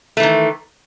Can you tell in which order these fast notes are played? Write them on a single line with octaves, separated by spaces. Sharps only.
A3 E3 D#3